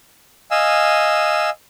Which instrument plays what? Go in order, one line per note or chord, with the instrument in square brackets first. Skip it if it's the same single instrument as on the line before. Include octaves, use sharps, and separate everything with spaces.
[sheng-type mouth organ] D#5 F5 G#5 E6